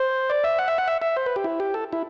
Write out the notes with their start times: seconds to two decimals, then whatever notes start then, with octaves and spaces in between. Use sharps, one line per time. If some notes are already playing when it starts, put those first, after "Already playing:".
Already playing: C5
0.30 D5
0.44 E5
0.59 F#5
0.68 E5
0.78 F#5
0.88 E5
1.02 E5
1.17 C5
1.26 B4
1.36 G4
1.44 E4
1.60 G4
1.74 A4
1.93 E4